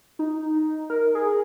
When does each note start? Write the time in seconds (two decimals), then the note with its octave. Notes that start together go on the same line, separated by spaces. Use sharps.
0.19 D#4
0.90 A#4
1.15 G#4